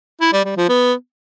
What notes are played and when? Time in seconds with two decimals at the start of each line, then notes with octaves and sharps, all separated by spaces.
0.21 E4
0.33 G3
0.45 G3
0.57 F3
0.69 B3